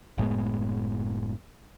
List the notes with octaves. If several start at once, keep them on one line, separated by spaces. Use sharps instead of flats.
F#1 A2 G#3 B3